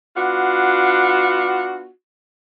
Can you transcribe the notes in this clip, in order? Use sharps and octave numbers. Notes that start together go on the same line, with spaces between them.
B3 D4 F4 F#4